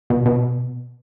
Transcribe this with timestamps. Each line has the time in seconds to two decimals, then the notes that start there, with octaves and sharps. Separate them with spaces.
0.10 B2
0.26 B2